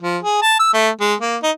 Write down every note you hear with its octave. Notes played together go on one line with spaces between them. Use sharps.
F3
G#4
A5
E6
A3
G#3
A#3
D#4